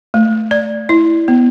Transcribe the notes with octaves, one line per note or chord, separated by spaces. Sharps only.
A3
D5
E4
B3